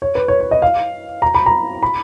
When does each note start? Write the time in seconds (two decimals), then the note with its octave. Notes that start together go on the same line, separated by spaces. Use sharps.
0.02 C#5
0.15 B4
0.28 C#5
0.40 C#5
0.51 D#5
0.62 F5
1.22 A#5
1.34 B5
1.46 A#5
1.83 B5